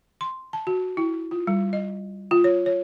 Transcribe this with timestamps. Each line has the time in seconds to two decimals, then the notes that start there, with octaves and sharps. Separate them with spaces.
0.21 C6
0.53 A5
0.67 F#4
0.97 E4
1.31 F4
1.47 G3
1.73 D#5
2.31 F4
2.44 C#5
2.66 C#5